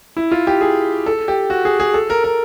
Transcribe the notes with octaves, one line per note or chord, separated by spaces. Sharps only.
E4
F4
G4
G#4
A4
G4
F#4
G#4
G#4
A4
A#4
A#4